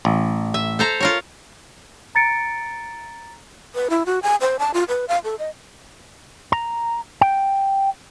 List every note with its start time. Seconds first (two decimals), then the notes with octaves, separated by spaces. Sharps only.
0.05 A1
0.54 E5
0.79 A4 C5 A#5
1.00 F4 A#4 C#5
2.15 A#5 A6 C#7 D7
3.75 B4
3.90 E4
4.06 F#4
4.23 G#5
4.41 C5
4.59 A5
4.74 F4
4.88 B4
5.08 F5
5.24 A4
5.39 D#5
6.52 A#5
7.21 G5